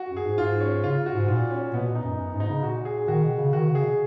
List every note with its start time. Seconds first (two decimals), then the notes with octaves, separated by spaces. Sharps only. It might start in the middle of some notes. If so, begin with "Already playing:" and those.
Already playing: F#4
0.09 F#2
0.17 G#4
0.24 G#2
0.38 G#2 F4
0.60 C#4
0.84 C#3 F4
1.06 F#4
1.13 G#2
1.28 A#2 F4
1.51 C#4
1.74 B2 B3
1.88 A#2
1.95 D#4
2.03 F#2
2.18 F#2
2.33 G#2
2.40 D#4
2.48 C#3
2.63 A#2 F#4
2.85 G#4
3.08 D#3 F#4
3.23 B2
3.39 C#3
3.53 D#3 F#4
3.68 C#3
3.75 G#4
3.83 B2